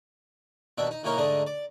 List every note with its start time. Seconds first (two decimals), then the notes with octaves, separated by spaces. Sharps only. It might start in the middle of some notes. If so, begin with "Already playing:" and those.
0.78 D#2 B2 D4 E5
0.91 D#4
1.03 B1 E3 A#3 C#4 D#4 A#4
1.17 G#2 D3 A3 D4 D#5
1.47 D5